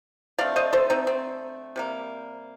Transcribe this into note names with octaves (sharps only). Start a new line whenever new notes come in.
D3 A3 C4 D5 F5
C5 D#5
A4 C5
C4 D#4
C4
C3 G3 A#3